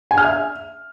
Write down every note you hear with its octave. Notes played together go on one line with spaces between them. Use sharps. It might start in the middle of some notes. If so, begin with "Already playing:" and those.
G#5
F6
E5